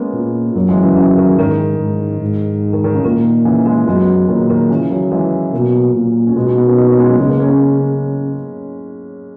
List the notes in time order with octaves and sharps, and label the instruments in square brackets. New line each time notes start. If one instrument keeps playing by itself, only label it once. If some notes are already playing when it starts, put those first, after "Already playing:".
Already playing: [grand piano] G#3 A#3 B3 C#4
[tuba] A#2
[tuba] F#2 [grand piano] F#3 A#3
[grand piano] E3 G#3
C#3 E3
C#3 E3
D#3
[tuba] G#2 [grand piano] D#3
[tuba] G#2
G#2
[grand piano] D#3
D#3
C#3
[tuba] A#2 [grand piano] D#3
[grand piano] C#3 E3
E3 G#3
[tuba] F#2 [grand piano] G#3 B3
[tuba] A#2 [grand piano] D#3 F#3
[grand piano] D#3
C#3 E3
D#3 F#3
E3 G#3
[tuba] B2 [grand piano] F#3 A#3
[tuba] A#2
[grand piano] C#4
[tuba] B2 [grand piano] G#3 B3
[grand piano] B3 D#4
B3 D#4
A#3 C#4
B3 D#4
A#3 C#4
G#3 B3
F#3 A#3
[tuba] C#3 [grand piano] G#3 B3
[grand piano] A#3 C#4
A#3 C#4
A#3 C#4